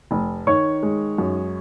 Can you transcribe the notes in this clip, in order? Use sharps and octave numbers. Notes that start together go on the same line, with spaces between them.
F1
D#3 C#5 C#6
G#3
F#2